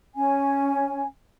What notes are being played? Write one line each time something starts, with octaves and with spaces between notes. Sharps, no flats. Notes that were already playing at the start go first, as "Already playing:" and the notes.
C#4 G#5